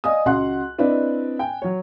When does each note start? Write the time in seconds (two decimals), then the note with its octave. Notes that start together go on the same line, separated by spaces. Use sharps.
0.04 D5 D#5 F5 G#5 D#6
0.25 C#2 F#4 F#5 C6 F#6
0.78 C4 D4 E4 B4 D5 D#5
1.39 G5 G#5
1.62 F#3 C#5